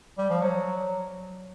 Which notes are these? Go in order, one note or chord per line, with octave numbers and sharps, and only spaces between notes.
G3
F3
F#3